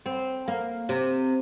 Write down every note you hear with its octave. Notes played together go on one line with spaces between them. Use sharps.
C4
A#3
C3